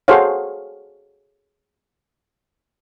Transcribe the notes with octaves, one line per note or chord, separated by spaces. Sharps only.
F#4 G#4 A4 C5 C#5 F5